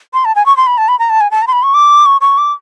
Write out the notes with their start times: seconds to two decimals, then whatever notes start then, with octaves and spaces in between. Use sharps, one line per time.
0.14 C6
0.25 A5
0.36 G#5
0.46 C#6
0.57 C6
0.67 B5
0.78 A5
0.88 B5
0.99 A#5
1.10 A5
1.21 G#5
1.31 A5
1.42 A#5
1.47 C6
1.53 B5
1.63 C#6
1.74 D6
2.06 C#6
2.21 C#6
2.38 D6